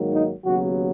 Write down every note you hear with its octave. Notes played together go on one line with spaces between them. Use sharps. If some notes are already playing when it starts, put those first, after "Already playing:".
Already playing: G#2 D#3 F#3 A#3
D#4
D#2 C#3 F#3 B3 F#4